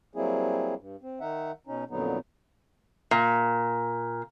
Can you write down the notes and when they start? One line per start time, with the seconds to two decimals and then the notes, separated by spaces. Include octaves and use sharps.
0.15 F#3 G3 A#3 C4 E4 G#4
0.78 G2
1.02 C4
1.20 D#3 D#4 E5 F#5
1.67 B2 C#4 D#4
1.90 F2 A#2 D3 F#3 B3 D#4
3.11 A#2